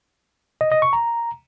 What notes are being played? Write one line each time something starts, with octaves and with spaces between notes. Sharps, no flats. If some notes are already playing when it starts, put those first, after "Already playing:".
D#5
D#5
C#6
A#5